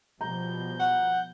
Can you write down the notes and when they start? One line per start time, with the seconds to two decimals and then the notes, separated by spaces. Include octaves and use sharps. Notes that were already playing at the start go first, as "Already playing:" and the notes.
0.21 B2 F3 G3 A#5 G6
0.80 F#5